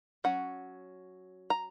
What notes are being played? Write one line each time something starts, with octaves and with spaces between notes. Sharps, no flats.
F#3 C#4 F#5
A#5